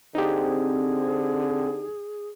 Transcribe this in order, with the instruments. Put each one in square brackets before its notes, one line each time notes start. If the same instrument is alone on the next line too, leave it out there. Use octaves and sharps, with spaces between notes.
[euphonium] D3 [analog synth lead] C4 [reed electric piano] D#4 G4 [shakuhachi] G#4